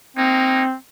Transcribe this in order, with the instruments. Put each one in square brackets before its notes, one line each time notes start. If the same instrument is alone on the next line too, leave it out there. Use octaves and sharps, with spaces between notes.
[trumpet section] A#3 D#4 [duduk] C4